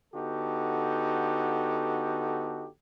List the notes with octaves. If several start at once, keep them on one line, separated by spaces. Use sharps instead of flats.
D3 B3 D#4 F#4 G4 A4